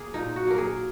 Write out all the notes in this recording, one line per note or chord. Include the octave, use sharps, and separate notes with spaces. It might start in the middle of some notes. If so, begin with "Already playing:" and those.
Already playing: A#3 G#4
A#2 D#4
F#4
F#3 A#3 A#4
G#4